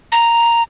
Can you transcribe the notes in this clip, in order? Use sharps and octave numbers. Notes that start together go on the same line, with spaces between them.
A#5